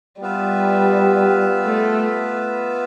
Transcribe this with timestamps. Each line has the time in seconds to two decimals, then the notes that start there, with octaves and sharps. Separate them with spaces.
0.21 G3 B3 F4 B4 E5
1.64 A3